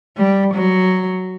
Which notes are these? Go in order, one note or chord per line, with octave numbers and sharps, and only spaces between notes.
G3
F#3